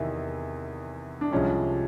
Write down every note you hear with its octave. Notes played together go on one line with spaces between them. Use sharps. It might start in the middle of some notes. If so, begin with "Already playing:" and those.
Already playing: E2 C3 D#3 E4
D4
C2 C3 F3 G#3 C#4